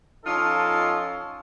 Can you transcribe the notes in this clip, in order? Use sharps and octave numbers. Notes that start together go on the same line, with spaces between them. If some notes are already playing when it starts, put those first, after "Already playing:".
F3 C#4 D#4 F4 A4 D#5